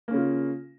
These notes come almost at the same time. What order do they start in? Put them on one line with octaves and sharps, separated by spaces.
A#3 C#4 C#3 F4